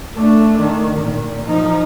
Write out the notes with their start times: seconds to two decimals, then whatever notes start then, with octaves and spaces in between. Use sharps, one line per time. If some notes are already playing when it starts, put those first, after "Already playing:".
0.16 A3 D4
0.60 D#3
0.99 A#2
1.47 F3 D#4